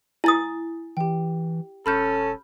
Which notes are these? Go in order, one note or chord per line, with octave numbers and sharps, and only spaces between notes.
E4 G#5 D#6 A6
E3 G4 G5
E1 C#4 A4 B5 F6 G6